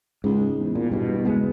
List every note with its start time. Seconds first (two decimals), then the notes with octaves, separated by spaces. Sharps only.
0.24 C#2 G#2
0.60 E2
0.75 A#2
0.91 G2 B2
1.25 C#2 G#3 B3